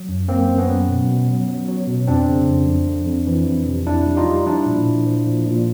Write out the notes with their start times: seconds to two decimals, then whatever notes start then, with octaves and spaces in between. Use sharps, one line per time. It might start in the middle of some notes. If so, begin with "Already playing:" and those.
Already playing: F#3
0.09 F#2
0.28 F#2 A#3 C4
0.49 F#2
0.58 B3 C#4
0.69 F#3
0.88 B2
1.08 B2
1.28 F#3
1.49 F#3
1.68 F#3
1.88 B2
2.08 F2 C4 D4
2.28 C#3
2.48 F2
2.67 F2
2.87 F2
3.07 F2
3.27 E3
3.47 F2
3.67 C3
3.87 F2 D4 E4
4.07 G3
4.17 D#4 F4
4.27 G3
4.46 F3 D4 E4
4.66 A#2
4.86 A#2
5.06 F3
5.26 A#2
5.46 A#2